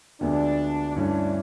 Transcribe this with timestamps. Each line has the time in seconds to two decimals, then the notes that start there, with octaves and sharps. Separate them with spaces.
0.21 D2 D3 F3 G#3 B3 D4
0.96 G2 E3 A3 C#4 D4